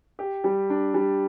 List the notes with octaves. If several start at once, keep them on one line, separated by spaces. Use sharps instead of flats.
G4
G3
D4
G3